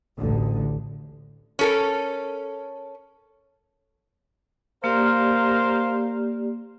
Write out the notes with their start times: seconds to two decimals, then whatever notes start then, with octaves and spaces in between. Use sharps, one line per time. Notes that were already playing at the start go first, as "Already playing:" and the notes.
0.18 A1 D2 D3
1.59 C#4 A4 A#4
4.84 A#3 G4 A#4 C5 D5 F5